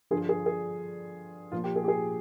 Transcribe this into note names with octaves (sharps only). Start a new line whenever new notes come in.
G2 D3 F3 G#4
G#4
G#4
A#2 F3 F4
G4
G#4
G4
G#4